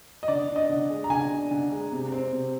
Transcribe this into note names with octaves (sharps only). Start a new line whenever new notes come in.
D#5
D3 D5
D4
D#5
D3
G#3
A#5
D3 G#5
D4
D3
G#3
C3
C4
C3